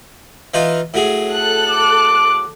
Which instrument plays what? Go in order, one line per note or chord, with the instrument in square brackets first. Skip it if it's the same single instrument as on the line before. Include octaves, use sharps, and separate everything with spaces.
[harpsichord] E3 D#4 F4
A2 F#3 G#4
[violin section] A4 F#6
[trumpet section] D6